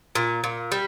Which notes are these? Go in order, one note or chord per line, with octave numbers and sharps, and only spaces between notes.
A#2
A#2
G3